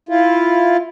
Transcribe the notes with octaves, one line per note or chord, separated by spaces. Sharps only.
E4 F4